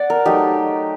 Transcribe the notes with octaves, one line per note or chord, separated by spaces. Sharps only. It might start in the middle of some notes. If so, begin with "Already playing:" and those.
Already playing: D5 F#5
A#4
F#3 A3 D#4 G4